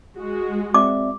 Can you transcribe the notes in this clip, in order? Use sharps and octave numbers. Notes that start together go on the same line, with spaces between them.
G#3 F#4
C4 D5 E5 D6